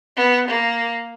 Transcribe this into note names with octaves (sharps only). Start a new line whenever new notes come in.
B3
A#3